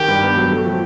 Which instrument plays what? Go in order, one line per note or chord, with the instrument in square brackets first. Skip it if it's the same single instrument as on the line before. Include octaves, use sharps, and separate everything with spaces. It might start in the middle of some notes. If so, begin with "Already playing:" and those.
Already playing: [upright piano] D#3 [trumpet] G4
[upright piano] G2
B3
F#3
A3
F3